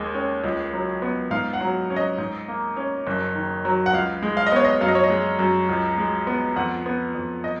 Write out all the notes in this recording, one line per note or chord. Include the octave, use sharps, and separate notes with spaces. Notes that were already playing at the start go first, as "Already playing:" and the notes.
Already playing: D#2 G#3
C#4
C#2
F#3
B3
G#2 F5
F#5
F#3
C#4
D#5
G#2
A#3
C#4
F#1
D#3
F#3
F#5
C#2 F5
G#3
F5
D#5
B3 C#5
D#5
F#2 F5
D#5
C#5
D#5
G#3
F#2
C#2
G#3
B3
F2 F#5
B3
F2
D#5